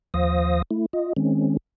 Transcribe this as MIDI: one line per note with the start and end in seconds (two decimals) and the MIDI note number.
0.14 0.62 39
0.14 0.62 53
0.14 0.62 72
0.14 0.62 77
0.14 0.62 87
0.14 0.62 94
0.71 0.86 57
0.71 0.86 64
0.93 1.13 65
0.93 1.13 75
1.17 1.57 51
1.17 1.57 56
1.17 1.57 60
1.17 1.57 61